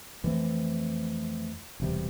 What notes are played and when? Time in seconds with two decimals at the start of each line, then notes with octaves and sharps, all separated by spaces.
0.24 F2 E3 A3 C4
1.80 E1 E2 C3 G3